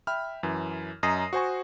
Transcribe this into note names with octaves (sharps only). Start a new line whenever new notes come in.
E5 G5 B5 F6
F#2 E3
F#2 D#5 A#5 D#6 A#6 C7
F#4 C5 G#5 C#6